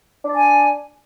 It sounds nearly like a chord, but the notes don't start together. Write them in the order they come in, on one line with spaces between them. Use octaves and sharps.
D4 D5 G#5